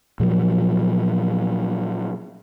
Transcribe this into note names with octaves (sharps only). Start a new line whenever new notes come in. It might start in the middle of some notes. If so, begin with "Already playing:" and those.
A#2 F3 F#3